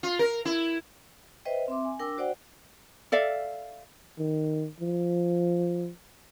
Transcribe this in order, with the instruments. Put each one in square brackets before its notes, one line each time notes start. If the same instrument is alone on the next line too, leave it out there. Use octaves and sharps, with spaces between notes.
[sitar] F4
A#4
E4
[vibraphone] B4 C5 D#5 E5 G5
C4 E5 C6 D6
G#5
D4 A#4 G5 D6 E6
F#4 C5 D5 F#5 G5
[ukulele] A4 D5 E5 F5
[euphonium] D#3
F3